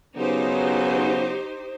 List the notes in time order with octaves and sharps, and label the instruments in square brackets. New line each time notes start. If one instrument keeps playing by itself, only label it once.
[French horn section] C#3 F#3 B3 [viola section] D#4 G4 C5